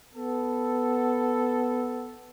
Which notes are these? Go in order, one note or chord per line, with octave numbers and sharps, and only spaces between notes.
B3 A4